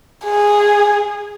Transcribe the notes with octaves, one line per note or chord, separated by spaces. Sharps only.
G#4